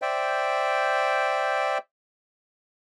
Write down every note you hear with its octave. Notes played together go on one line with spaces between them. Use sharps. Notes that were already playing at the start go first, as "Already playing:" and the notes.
C5 D5 E5 G5